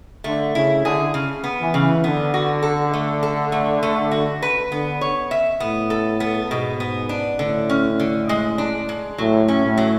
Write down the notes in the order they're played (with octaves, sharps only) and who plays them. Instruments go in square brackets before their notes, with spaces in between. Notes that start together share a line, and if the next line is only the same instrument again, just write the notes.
[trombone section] D3 [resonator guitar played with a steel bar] A3
[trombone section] C#3 [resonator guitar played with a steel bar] E4
[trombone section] D3 [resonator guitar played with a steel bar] G#4
[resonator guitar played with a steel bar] C#3
B3
[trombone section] E3
[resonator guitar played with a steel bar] C#3
[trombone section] D3 [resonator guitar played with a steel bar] B3
[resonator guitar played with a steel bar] F#4
A4
A3
A4
A3
A3
F#4
B4
[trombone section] D3 [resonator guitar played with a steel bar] B3
[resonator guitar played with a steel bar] C#5
E5
[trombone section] A2 [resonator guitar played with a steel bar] B3
[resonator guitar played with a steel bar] A4
B3
[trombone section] G#2 [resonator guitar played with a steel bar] B2
[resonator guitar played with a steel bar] B3
D4
[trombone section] A2 [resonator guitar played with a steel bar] D3
[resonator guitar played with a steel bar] C#4
D3
G#3
D4
G#3
[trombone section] A2 [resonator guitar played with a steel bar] F#3
[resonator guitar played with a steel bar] C#4
[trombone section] A2
[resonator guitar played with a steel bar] F#3